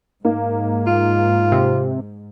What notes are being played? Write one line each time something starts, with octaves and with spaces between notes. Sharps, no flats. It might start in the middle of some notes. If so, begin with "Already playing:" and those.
G#2 A#3 D#4
F4
C3